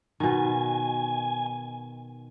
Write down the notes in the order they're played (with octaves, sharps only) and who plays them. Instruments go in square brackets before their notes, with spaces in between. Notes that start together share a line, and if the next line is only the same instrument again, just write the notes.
[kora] B2 D#3 [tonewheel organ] G#5